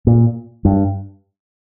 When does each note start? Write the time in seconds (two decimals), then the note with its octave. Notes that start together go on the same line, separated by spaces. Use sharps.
0.07 A#2
0.65 G2